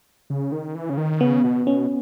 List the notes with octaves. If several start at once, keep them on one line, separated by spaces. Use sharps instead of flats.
C#3
D#3
E3
C#3
D#3
C#3 B3
B2
B2 C#4